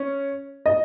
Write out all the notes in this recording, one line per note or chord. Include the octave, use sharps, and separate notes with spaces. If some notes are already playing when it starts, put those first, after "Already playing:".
Already playing: C#4
D#5